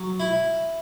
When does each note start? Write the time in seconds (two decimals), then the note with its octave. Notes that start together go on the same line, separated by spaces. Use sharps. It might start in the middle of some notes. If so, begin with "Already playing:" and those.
Already playing: F#3
0.20 E4